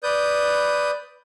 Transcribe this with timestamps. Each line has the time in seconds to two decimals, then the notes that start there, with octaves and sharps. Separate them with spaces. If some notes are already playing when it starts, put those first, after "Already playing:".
0.03 B4 D5 D#6 G6